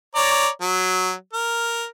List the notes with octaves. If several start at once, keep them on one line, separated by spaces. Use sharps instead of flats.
C#5 D5 A#5
F#3
A#4